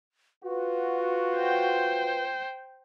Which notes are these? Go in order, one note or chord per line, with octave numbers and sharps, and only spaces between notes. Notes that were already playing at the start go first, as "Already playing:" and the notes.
F4 F#4 B4
C5 G5